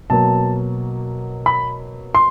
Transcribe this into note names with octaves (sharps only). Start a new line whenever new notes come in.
B2 F#3 A#3 A5
B5
C6